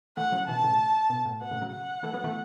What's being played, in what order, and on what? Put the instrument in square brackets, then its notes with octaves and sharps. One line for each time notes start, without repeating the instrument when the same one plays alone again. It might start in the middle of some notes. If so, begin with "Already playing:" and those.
[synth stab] E3 A3 [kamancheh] F#5
[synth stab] C#3 F#3
[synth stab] B2 E3 [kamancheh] A5
[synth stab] A2 C#3
B2
A2
[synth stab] B2 [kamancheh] F#5
[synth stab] A2 C#3
C#3 F#3
[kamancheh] F#5
[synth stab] E3 A3
F#3 B3
E3 A3